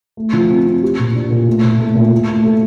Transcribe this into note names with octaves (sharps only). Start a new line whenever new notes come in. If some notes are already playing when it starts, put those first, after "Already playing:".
A3
F3
C4
C4
G4
A#2
D4
A#2
A3
A#2
A3
A#2
A3
A3
A4